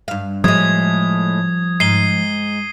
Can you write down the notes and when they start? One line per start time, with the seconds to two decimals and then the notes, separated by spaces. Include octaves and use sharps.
0.08 G2 F5
0.44 A2 F3 G3 G#3 D#6 G#6
1.80 G#2 C7 D#7 G7